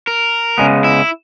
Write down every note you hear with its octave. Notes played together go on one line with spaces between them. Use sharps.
A#4
C#3 G#3 B3
E4